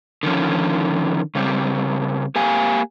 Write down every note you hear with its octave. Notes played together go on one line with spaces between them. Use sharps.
D3 D#3 F3 C#4
C#3 G3 C4
A#3 G4 F5 G#5